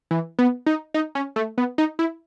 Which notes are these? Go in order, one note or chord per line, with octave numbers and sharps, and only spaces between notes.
E3
B3
D#4
D#4
C#4
A3
B3
D#4
E4